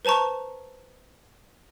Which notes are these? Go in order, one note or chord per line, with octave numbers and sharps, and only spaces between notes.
B4 C5 A5 A#5 C#6